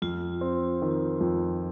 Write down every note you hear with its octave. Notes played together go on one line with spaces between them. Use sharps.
F2 F4
C4
D#3
F2